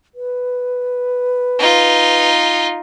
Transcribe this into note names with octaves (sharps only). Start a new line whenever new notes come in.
B4
D#4 F4